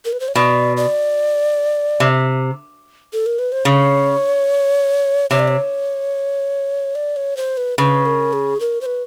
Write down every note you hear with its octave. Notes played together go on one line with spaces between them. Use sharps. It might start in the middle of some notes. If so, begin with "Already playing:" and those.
A#4
B4
C5
C#5
B2 D5
D5
C3
A4
A#4
B4
C5
C#3 C#5
C3 C#5
D5
C#5
D5
C#5
C5
B4
C#3 B4
A#4
G#4
A#4
C5
B4